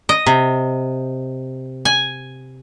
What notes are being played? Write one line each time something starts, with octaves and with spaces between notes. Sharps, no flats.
D#5
C3
G#5